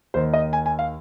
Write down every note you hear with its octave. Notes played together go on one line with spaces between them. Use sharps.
D#2 D#3 C5
D#5
G#5
G#5
F5